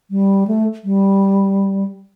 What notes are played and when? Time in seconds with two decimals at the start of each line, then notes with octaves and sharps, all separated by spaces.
0.11 G3
0.47 A3
0.84 G3